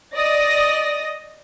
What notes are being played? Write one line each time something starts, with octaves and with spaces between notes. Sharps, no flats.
D5 D#5 D#6 A#6